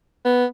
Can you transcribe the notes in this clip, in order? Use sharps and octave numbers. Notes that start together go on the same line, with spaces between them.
B3